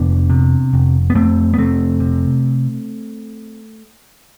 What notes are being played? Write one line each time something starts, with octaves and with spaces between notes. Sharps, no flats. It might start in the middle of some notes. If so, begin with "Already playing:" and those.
Already playing: F1 B3 D4
C3
F1
B3
F2 A3 C4
B3
F1 A3 C4
C3